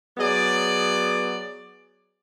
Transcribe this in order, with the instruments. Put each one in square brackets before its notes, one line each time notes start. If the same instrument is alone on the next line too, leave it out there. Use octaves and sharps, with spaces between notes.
[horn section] F#3 B3 G#4 D5